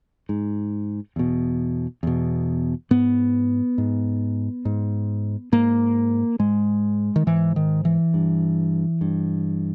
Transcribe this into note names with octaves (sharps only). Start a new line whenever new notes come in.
G#2
E2 B2
E2 B2
G#2 B3
G#2
G#2
G#2 A#3
G#2 G#3
D#3
G#2 E3
D#3
E3
G2
G2